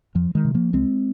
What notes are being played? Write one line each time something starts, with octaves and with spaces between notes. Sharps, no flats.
F2 F3
D#3 G#3
C3
F3 A#3
C2 G#3 C4